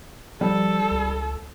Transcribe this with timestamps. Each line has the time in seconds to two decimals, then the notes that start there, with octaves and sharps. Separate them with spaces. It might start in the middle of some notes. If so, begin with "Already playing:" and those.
0.41 F3 G3 A4
0.91 C#2